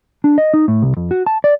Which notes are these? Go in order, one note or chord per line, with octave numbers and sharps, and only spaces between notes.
D4
D#5
D#4
A2
C2
F2
F#4
A5
D5